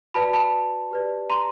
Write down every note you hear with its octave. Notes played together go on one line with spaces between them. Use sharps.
F#4 B4 D5 A5 B5
A5 B5
G4 B4 D5
A#5 C6